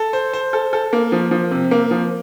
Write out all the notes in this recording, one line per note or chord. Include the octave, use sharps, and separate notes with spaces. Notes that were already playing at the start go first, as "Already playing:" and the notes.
Already playing: A4
C5
C5
A4
A4
A#3
F3
F3
C3
A#3
F3